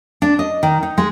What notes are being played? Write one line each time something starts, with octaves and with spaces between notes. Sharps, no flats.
D4
D#5
D#3
D#4
G#3